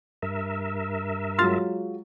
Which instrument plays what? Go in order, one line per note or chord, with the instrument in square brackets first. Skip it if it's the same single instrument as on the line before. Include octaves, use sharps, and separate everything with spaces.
[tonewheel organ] G2 A#4 E5
[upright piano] F#3 G#3 F4 [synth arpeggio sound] C6 F6 A6